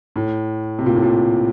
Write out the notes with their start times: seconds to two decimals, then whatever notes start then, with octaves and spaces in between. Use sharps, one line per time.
0.16 A2
0.79 C3
0.86 A#2
0.95 A2
1.03 A#2